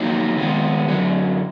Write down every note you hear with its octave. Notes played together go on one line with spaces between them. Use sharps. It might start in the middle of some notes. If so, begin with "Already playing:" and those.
Already playing: F#3 A#3 D#4
D#3 G#3 B3 F4
F#2 D3 F#3